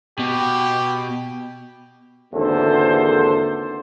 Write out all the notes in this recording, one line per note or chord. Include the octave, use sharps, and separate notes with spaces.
B2 G4
G#1 E2 D3 A#3 A4 C5